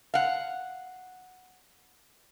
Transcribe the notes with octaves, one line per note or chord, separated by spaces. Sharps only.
F5 F#5